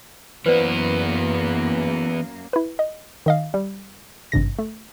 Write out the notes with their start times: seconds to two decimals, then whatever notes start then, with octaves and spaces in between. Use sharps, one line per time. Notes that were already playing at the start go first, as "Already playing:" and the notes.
0.46 F#2 E3 A#3 B3 B4 C5 D5
2.53 E4 B4
2.79 D#5
3.26 D#3 D#5 F5
3.54 G3
4.32 G#1 G2 C3 A#6
4.59 A3